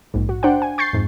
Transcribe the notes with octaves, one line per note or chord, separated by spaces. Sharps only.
A#1 G#2
F#4
D4 C5 F#5 G5
G#5
C#6 G6 A6 C7
F2 G#2